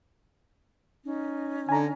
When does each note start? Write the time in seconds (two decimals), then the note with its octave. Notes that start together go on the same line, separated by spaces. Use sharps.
1.04 C#4 D#4
1.69 D3 G#5 A#5